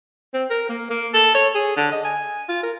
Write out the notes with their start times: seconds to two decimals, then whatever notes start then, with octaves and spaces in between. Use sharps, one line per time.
0.34 C4
0.50 A#4
0.69 A#3
0.90 A#3
1.13 A4
1.35 C#5
1.55 G#4
1.77 D3
1.92 D#5
2.05 G#5
2.48 F4
2.63 A#4